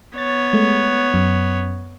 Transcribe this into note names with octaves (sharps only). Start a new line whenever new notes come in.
B3 C#5 A6
G#3 A3
F#2